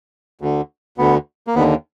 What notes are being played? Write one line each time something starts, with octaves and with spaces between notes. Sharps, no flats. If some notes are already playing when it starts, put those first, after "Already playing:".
D2 D3
D2 D3 B3
A#3
D#2 D3 B3